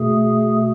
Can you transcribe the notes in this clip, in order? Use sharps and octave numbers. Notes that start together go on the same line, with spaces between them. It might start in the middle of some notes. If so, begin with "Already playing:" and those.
Already playing: B2 A3 G#4